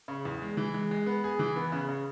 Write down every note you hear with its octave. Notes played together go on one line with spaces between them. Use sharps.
C#3
E2
G#3
E3
G#3
G#3
B3
G#4
E3
B3
C#3
C#3